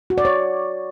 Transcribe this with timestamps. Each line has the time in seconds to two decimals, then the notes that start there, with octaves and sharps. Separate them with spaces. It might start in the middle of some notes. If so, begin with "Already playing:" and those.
0.10 F#4
0.18 D5
0.25 C#5